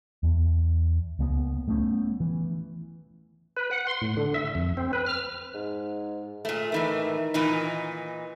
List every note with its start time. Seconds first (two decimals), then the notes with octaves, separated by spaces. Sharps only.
0.23 E2
1.19 C#2 A#3 B3
1.68 G3 A3 B3 C#4
2.20 E3
3.57 B4
3.71 F#5
3.87 C6
4.01 A2
4.17 D3
4.34 E5
4.55 F2
4.77 C4
4.93 B4
5.06 F6
5.54 G#2
6.45 A#2 A3
6.72 A2 D#3 E3 A3
7.34 A#2 E3 D#4